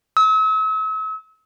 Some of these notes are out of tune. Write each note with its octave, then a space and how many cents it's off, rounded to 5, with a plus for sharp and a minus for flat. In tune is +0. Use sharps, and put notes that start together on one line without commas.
E6 -40